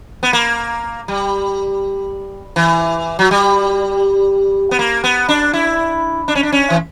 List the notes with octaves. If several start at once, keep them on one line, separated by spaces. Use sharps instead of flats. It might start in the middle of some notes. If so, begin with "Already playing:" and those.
B3
A#3
G3
E3
F#3
G3
B3
A#3
B3
D4
E4
D4
C#4
D4
C#4
E3